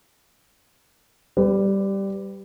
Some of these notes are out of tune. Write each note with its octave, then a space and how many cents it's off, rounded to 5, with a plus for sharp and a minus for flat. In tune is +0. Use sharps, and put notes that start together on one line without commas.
G3 +0 B4 +30